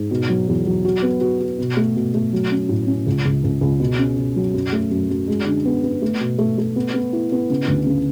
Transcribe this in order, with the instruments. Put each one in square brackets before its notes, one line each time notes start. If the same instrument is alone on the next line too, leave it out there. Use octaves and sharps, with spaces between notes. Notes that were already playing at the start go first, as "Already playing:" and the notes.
Already playing: [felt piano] G#2
B2
F#3
E2
F#3
F#4
B3
F#4
F#4
B2
A3
B2
A3
F#3
C#4
A2
C#4
C#2
C#2
C#2
C#2
B2
C#4
B2
F#3
F#2
A3
F#2
F#2
G#3
D3
B3
B3
A3
B2
A3
A3
B3
B3
E4
B3
C#3
D2
C#3